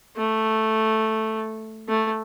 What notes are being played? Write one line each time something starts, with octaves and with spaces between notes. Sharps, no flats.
A3
A3